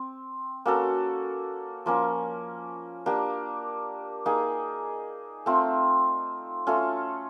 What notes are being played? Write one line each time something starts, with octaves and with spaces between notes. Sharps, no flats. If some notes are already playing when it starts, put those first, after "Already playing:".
Already playing: C4
A#3 C#4 F#4 A4
F3 A#3 C#4
A#3 D4 G4
A#3 D#4 G#4
A3 C4 F4
A3 C#4 F4 A4